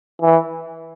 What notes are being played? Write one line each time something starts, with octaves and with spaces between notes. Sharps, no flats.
E3